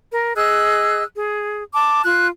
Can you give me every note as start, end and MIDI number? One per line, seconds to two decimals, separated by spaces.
0.11 0.32 70
0.36 1.03 68
0.36 1.03 75
0.36 1.03 88
0.36 1.03 90
1.15 1.61 68
1.74 2.02 81
1.74 2.02 86
2.05 2.27 65
2.05 2.27 90